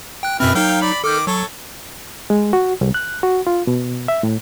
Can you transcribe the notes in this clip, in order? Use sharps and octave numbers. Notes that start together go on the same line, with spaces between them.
G5 F#6
F#2 B2 C4 E4 B4 F6
F#3 A#3 D#4 F5 G5
D5 B5
D#3 A4 D6 F6 G6
F#3 A4 C#5
G#3
F#4
C2
F#6
F#4
F4
B2
E5
A2